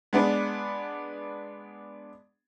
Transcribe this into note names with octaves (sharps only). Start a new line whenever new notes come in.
G#3 B3 D4